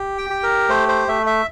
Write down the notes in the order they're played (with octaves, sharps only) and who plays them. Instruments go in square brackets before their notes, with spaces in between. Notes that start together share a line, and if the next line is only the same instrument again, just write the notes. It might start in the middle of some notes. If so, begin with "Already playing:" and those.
Already playing: [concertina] G4
G5
G4
A#4
A3 C5
C5
A3 E5
E5